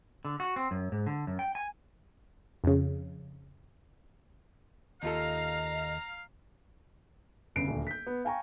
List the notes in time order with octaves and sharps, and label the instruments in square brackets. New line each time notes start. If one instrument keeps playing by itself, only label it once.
[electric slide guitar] D3
F#4
C4
F#2
G#2
D3
F#2
G5
G#5
[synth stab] F2 C#3
[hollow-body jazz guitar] D#2 F4 A4 [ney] D#5 [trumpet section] F5 [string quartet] A#5
[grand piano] G1 C#3 C7 D7
D#1 D2
G6 B6
B3
F5 G5 G#5 A#5 C#6